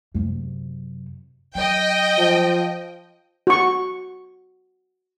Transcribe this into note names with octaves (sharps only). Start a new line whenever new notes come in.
F#2 C3
F#3 D#5 G5
F3
F#4 C#6